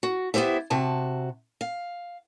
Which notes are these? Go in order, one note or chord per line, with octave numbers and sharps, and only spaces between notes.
F#4
B3 E4 G4 C5 E5
C3 F#4 A5
F5